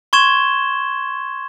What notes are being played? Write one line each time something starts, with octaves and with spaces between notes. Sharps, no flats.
C6 C#6 G#6 E7 G7